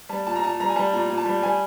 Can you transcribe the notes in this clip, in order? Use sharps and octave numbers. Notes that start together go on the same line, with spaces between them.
G3 A5
A#2 A5
A#5
A#2 A5
G3 A#5
G#5
G3 A5
A#2 A#5
A#2
A5
G3
G3 G#5